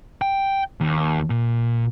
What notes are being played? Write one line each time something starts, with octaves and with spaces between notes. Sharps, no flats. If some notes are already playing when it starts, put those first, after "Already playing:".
G5
D#2
A#2